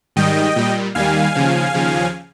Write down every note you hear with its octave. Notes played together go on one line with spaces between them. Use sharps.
G#2 D#3 G3 D#5 G5
A#2 G3
D#2 D#3 G3 F5 G#5
D#2 C#3 F3
D#2 C#3 F3